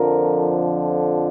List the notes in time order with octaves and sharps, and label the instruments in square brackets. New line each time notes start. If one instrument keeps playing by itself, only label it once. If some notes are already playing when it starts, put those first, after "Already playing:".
Already playing: [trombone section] F2 D3 F3 A#4